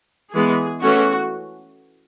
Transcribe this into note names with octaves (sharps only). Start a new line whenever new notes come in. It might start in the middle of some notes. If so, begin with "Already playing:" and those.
E3 G#3 B3 G#4
E3 A3 C#4 F#4